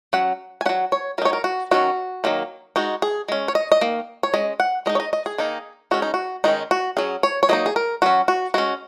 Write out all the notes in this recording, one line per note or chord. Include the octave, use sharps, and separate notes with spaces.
F#3 C#4 F#5
G#5
F#3 C#4 F#5
C#5
F#3 D#4 A#4 C#5
A#4
F#4
D#3 F#3 C#4 F#4
D#3 F#3 A#3
G#3 D#4 F#4
G#4
G#3 C#4
C#5
D#5
D#5
D#3 A#3
C#5
G#3 C#4 D#5
F#5
G#3 D#4 D#5
C#5
D#5
D#5
G#4
D#3 A#3 D#4
G#3 C#4 F#4
D#4
F#4
D#3 G#3 C#4 D#4
F#4
F#3 C#4 G#4
C#5
C#5
F#3 A#3 D#4 D#5
G#4
A#4
F#3 C#4 F#4
F#4
G#3 C#4 F#4